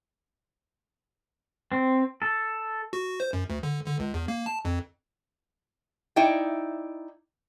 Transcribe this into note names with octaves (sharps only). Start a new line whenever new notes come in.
C4
A4
F#4
C5
F#2
D2
D3
D3
C#2
E2
A#3
A5
F2
D#4 E4 D5 G5